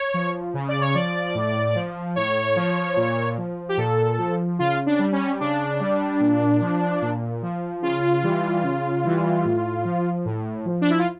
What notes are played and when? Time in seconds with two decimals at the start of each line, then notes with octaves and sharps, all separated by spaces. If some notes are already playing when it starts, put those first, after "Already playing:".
Already playing: C#5
0.14 F3
0.54 C#3
0.68 D5
0.81 C#5
0.95 F3 D5
1.35 A2
1.75 F3
2.16 A2 C#5
2.56 F3
2.97 A#2
3.38 F3
3.69 G4
3.78 A#2 A4
4.19 F3
4.59 C#3 F4
4.86 D4
4.99 G3
5.12 C#4
5.40 C#3 D4
5.80 G3
6.20 A#2
6.61 F3
7.02 A#2
7.42 F3
7.83 C#3 F4
8.23 E3 G3
8.64 C#3
9.04 E3 G3
9.45 A2
9.85 F3
10.25 A2
10.66 F3
10.82 D4
10.90 E4
10.99 F4